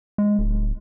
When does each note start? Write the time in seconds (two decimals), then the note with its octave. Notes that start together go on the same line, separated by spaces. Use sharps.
0.18 G#3
0.39 D1